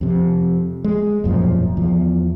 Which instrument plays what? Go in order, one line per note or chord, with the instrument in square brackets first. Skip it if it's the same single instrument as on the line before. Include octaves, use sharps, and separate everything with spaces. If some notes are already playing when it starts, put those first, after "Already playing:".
[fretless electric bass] F2 C3
G#3
E1 F#2 A#2 F3
E2 F3